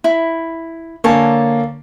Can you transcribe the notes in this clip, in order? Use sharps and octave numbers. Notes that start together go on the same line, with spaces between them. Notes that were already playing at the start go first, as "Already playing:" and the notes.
E4 B5
D3 A#3 C#5 G#5 A5